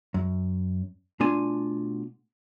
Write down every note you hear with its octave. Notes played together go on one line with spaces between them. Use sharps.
F#2
B2 A3 D4 F4 G#5